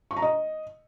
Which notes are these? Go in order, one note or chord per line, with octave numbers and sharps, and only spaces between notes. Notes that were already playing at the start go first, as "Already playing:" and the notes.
C#6
A#5
D#5